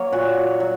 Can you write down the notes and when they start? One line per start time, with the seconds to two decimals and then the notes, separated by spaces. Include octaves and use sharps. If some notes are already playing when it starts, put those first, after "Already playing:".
Already playing: F#3 A#3 C#5
0.12 A#2 F#4
0.60 F#3